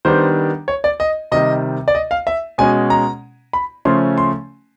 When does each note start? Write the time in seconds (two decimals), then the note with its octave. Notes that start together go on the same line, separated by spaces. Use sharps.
0.05 D#3 G3 B3 D4 C5
0.68 C#5
0.84 D5
1.00 D#5
1.32 C3 D#3 G3 D#5
1.88 D5
1.95 D#5
2.11 F5
2.27 E5
2.58 B2 G#3 C#4 G#5
2.90 A#5
3.53 B5
3.85 C#3 F3 A3 C#4 C6
4.18 C6